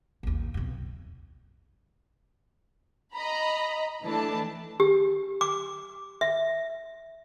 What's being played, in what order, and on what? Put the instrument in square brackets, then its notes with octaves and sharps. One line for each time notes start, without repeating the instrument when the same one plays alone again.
[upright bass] A1 D#2
B1 F2
[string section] D#5 A#5 B5
E3 A3 D4 A5
[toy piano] G4
D6
E5